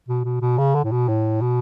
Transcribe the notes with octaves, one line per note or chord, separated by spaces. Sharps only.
B2
B2
B2
C#3
D3
A2
B2
A2
B2